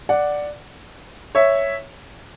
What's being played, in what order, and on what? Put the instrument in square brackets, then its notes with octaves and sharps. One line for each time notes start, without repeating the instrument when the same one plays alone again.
[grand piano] D5 F#5
C#5 E5